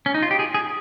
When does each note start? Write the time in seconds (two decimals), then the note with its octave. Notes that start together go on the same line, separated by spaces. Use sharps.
0.06 C#4
0.14 D#4
0.23 F4
0.31 G4
0.39 G#4
0.54 G#4